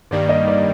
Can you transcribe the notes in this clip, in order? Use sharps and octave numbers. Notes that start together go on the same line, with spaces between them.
G2 D#3 G3 A#3 D5
D#5
D5